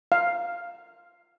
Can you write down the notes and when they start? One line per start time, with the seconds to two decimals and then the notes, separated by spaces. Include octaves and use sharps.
0.12 F5